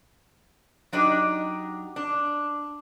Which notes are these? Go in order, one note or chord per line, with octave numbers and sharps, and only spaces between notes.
F#3 D4 D#4 G4 D5
D4